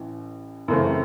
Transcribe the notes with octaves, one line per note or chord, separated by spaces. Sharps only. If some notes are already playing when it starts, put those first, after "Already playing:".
Already playing: A1 E3
F#2 C#3 E3 A3 C4